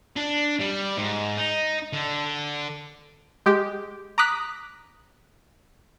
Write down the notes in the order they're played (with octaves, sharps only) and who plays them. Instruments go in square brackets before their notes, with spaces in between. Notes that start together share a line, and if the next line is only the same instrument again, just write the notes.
[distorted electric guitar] D4
G3
G#2
D#4
D3
[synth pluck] G#3 G4
A#5 D6 D#6 F#6 B6